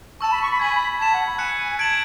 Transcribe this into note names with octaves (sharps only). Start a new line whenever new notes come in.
A5 C#6 E6 A6 E7
B5
C#6
B5
G#5 G#6 B6 F#7
B5
A5 G#6 B6 E7
F#5
B5
G#5 F#6 C#7 E7
A5 G#6 D7 F#7